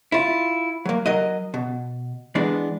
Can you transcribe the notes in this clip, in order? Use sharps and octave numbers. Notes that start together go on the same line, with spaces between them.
E4 F4
F#3 A#3
F#3 A#4 D#5
B2
E3 G#3 B3 D4